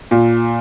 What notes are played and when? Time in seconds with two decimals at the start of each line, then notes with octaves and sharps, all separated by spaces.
0.11 A#2